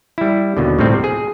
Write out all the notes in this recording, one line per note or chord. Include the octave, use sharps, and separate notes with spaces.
G3 E4
D#2 B2 D3
D2 A2 C3 F3 G3 C4
G#4